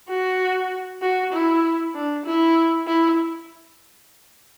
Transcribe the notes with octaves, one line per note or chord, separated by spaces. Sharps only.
F#4
F#4
E4
D4
E4
E4